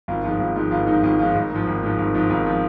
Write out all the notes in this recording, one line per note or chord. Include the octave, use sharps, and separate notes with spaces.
G#1 F4
G#2 F3 F4
G#1 F4
G#2 F3 F4
G#1 F4
G#2 F3 D#4
G#1 F4
G#2 F3 F4
G#1 D#4
G#2 F3
G#1
G#2 F3
G#1
G#2 F3
G#1 F4
F3